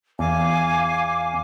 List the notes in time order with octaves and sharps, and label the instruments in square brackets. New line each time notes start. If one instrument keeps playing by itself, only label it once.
[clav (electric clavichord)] E2 [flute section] F5 G#5 D6